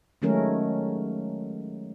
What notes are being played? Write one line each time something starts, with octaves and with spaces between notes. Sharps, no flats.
D#3 F#3 G#3 A3 C#4 A#4